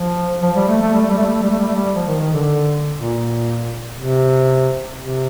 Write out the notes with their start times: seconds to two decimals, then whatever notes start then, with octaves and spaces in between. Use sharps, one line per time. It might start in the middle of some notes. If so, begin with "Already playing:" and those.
Already playing: F3
0.42 F3
0.56 G3
0.68 A3
0.81 A3
0.94 G3
1.02 A3
1.10 G3
1.18 A3
1.26 G3
1.35 A3
1.43 G3
1.50 A3
1.59 G3
1.68 A3
1.75 G3
1.96 F3
2.08 D#3
2.20 D#3
2.33 D3
2.98 A#2
3.99 C3
5.00 C3